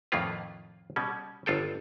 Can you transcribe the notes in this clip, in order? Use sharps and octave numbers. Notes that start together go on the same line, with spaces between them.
F2 A2 D#3 A#3 F4 B4
B2 G3 C#4
G1 F4 A4 G5